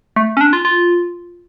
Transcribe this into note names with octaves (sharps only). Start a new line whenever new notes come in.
A3
C#4
D4
F4
F4